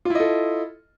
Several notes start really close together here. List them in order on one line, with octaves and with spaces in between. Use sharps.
F4 E4 D#5 A4